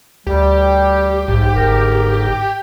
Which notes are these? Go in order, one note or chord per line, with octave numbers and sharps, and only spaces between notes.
D2 G3 G4
B1 G#2
G1 A#4